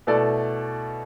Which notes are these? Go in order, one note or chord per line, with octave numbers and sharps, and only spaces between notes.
B2 A3 E4 A4 D5